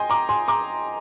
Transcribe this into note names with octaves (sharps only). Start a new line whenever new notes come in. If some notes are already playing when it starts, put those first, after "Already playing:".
Already playing: D#5 G5 G#5 C6
A#5 D6
G#5 C6
A#5 D6